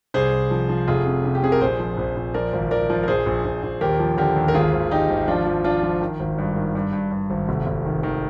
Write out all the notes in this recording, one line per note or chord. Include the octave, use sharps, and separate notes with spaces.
C2 G#4 C5
C2
F3
F3
F1 F4 G#4
C3
C3
G4
C3 G#4
A#4
A#1 G#4 C5
F3
A#1
A#1
F3 A#4 D5
G#1
G#1 A#4 D5
F3
A#4
A#1 G#4 C5
A#1
A#1
A#1
D#2 G4 A#4
F3
D3 G4 A#4
D#2
A#4
G#1 F4 G#4
G#1
G#1 D#4 G4
G#1
F3 D4 F4
F3
F3 D4 F4
F3
D#3
G#1
G2
D#3
G2
G2
G2
G#1
F1
F1
D#3
D#3